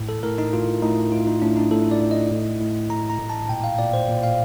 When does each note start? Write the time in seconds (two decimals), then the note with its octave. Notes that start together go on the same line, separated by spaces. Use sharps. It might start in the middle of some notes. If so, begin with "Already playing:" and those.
Already playing: A2
0.09 A4
0.23 A2 A#4
0.38 D#4
0.53 A2 F4
0.82 A2 D#4
1.12 A2 F4
1.27 D#4
1.42 A2 D4
1.57 D#4
1.71 A2 A4
1.91 D5
2.01 A2
2.11 D#5
2.31 A2
2.60 A2
2.90 A2 A#5
3.10 A#5
3.19 A2
3.30 A5
3.49 A#2 G5
3.64 F5
3.79 A#2 D5
3.93 C5
4.08 A#2
4.23 F5